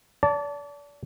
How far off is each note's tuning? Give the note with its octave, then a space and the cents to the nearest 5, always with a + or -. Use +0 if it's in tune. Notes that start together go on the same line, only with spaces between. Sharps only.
D5 -35 A5 +5